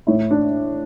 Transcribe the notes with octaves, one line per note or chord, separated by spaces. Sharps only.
A2 E4
D4